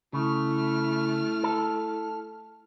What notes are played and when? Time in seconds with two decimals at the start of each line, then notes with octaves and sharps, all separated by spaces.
0.13 C#3 A3 E4 F6
1.44 A4